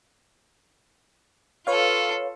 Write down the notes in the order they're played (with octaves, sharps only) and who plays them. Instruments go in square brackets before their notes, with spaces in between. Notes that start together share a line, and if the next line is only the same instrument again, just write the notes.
[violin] F4 A4 [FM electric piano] B4 C#5 F5